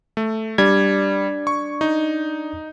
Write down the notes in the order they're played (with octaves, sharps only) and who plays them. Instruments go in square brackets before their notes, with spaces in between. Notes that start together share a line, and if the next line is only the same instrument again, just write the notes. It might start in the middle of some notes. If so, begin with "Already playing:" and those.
[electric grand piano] A3
[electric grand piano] G3 [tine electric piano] D4 D5 G#6
[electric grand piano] C#6
D#4